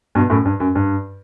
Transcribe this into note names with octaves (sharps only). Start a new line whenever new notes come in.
G2 B2
F#2 A2
G2
F#2
G2